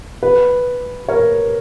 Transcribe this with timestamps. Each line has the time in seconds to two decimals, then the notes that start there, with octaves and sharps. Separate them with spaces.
0.23 B4
1.09 A#4 C#5